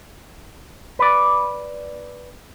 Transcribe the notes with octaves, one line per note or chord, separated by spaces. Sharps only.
B4 D5